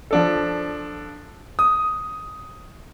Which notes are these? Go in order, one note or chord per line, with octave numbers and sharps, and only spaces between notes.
F3 D4 A4
D#6